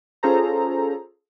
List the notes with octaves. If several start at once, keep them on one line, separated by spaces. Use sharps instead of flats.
C#4 F4 G#4 A4 C5 A#5